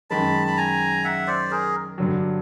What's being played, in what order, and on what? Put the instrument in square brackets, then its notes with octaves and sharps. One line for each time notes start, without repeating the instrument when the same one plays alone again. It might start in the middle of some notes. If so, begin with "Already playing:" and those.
[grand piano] F#2 D#3 G#3 [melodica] A5 B5
[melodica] B5
G#5 A#5
E5 F#5
C5 D5
G#4 A#4
[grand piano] G2 D3 F#3